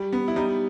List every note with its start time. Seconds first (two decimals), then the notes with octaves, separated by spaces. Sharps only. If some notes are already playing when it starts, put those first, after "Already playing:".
Already playing: G3
0.13 B3
0.28 E4
0.36 G3 D#4